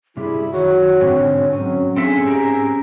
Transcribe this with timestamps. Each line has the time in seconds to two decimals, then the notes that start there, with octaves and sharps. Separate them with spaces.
0.17 G2 C3 G3 E4 G#4
0.53 F#2 D#3 F#4 C#5
1.01 B1 G#2 D3 C4
1.53 F#3 C4 C#4
1.96 C4 D4 G#4 A4 E5
2.24 G#2 C4 G4 A#4